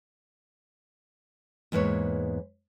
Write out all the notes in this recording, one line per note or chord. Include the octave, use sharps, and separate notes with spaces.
E2 G#2 A#3 B4 C#5